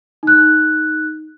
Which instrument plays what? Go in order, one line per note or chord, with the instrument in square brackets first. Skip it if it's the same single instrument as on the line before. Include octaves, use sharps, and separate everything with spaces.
[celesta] D#4 F#6